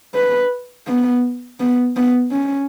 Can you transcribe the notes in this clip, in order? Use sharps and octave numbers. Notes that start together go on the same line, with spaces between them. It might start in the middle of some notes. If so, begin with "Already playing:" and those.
B4
B3
B3
B3
C#4